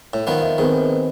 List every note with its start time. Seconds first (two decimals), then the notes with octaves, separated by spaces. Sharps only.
0.13 A2
0.27 D#3 F3 B3
0.42 E5
0.58 D#3 B3 C4 G#4